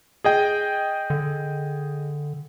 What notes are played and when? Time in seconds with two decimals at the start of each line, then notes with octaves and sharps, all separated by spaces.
0.24 G#4 D#5 G5
1.10 D3